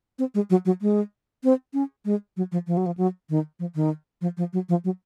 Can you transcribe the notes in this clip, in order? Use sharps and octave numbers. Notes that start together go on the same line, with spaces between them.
C4
G#3
F#3
F#3
G#3
C4
C#4
G#3
F#3
F3
F3
F#3
F3
F#3
D#3
F3
D#3
F3
F3
F#3
F3
F#3